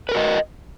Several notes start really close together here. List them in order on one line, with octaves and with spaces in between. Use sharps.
B4 A#4 F#4 D#5